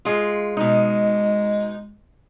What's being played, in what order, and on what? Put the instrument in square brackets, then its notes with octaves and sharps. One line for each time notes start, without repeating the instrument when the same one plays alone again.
[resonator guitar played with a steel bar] G#3 F4
[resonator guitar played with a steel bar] B2 D#4 [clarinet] G#3